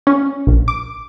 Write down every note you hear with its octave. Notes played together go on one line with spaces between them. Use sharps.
C#4
A#1
D6